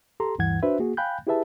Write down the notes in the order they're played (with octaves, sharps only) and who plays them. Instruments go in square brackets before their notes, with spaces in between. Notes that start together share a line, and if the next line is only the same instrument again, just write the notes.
[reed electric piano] G4 A4 A#5 C6
D2 G2 E3 F#5 G#6
D4 F#4 B4 C5 E5
A#3 F#4 G#4
F5 G5 G#5 B5 F#6 G6
E4 G4 G#4 B4 E5 A5